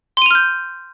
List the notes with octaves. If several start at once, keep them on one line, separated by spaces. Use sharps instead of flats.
C6 F6 G6 D#7 F7